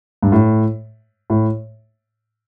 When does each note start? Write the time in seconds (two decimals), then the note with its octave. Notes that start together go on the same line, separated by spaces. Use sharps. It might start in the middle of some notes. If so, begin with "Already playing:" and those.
0.23 G2
0.32 A2
1.30 A2